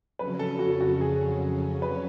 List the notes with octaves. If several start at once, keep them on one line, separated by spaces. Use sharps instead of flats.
F2 C#3 F#3 C#4 B4
A4
F#4
F#4
G#4
B4